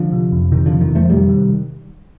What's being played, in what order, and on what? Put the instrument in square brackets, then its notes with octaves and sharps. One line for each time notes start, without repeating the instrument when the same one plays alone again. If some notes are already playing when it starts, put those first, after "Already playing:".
Already playing: [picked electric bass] D3 F3
C3
F2
C3 D#3
D3 F3
F2
D#3
F2
F3 A3
C3 D#3 G3
C3